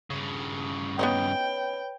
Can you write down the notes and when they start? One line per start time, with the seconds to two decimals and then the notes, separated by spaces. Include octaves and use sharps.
0.10 G2 C#3
0.99 B3 C#4 D#4 B4 C#5 G5 B5